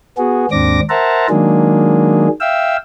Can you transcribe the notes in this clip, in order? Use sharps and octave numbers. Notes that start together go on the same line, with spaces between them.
B3 F#4 G#4
D#2 G#2 C4 D4 D6 A#6
A#4 C5 E5 F#5 A5 A#5
D#3 F#3 G#3 A#3 D4 G#4
E5 F5 G5 E6